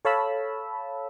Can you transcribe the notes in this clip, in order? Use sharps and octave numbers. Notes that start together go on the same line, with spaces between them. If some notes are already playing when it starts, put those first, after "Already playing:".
A4 C#5 F5 A5 B5 E6